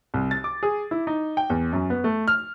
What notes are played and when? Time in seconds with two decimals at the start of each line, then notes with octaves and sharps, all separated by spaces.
0.14 C2
0.31 A6
0.44 D6
0.63 G#4
0.91 E4
1.07 D#4
1.37 G5
1.50 E2
1.73 F#2
1.90 B3
2.04 A3
2.28 F6